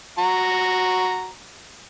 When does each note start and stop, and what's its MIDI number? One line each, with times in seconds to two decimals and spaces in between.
0.18 1.29 66
0.18 1.29 82